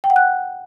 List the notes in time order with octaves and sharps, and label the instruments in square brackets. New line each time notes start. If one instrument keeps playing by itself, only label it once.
[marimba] G5
F#5
F#6